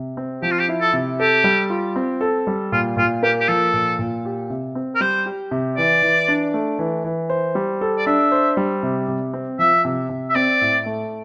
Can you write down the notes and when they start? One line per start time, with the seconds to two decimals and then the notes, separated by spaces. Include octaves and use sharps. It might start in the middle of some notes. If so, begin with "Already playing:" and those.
Already playing: C3
0.17 C4
0.42 F3 G4
0.51 F4
0.59 G4
0.69 E4
0.81 A4
0.93 C3
1.20 G4 A4
1.44 G3
1.70 F4
1.96 C4
2.21 A4
2.47 G3
2.72 A#2 F4
2.97 A#2 F4
3.23 A#3 G4
3.40 G4
3.48 F3 A4
3.73 A#2
3.99 A#2
4.25 G4
4.50 C3
4.75 C4
4.95 A#4
5.01 G3 C5
5.26 G4
5.51 C3
5.77 E3 D5
6.03 E3
6.28 D4
6.54 A3
6.79 E3
7.04 E3
7.30 C5
7.55 G3
7.81 A4
7.98 D5
8.06 D4 E5
8.32 C5
8.57 G3
8.83 C3
9.08 C3
9.33 C4
9.59 F3 E5
9.85 C3
10.10 C3
10.29 E5
10.35 C4 D5
10.61 A2
10.86 A3